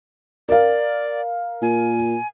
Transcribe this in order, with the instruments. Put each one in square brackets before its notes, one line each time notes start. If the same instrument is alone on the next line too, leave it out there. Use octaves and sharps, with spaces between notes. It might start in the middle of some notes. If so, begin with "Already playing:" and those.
[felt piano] A#4 F5 [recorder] D5
[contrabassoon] A#2 [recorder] G#5